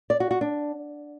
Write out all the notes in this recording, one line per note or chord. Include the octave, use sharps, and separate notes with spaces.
D5
F#4
F#4
D4